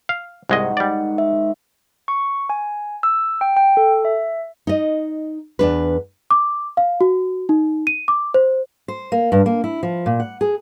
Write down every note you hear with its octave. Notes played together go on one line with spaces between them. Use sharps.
F5
C2 G#2 D#3 G#3 D#5 F#5
G3 D5
E5
C#6
G#5
E6
G5
G5
A4
E5
D#4 D#5
E2 D4 B4
D6
F5
F#4
D#4
D#7
D6
C5
C5
A#3
G2
A#3
E4
F3
A#2
F#5
G#4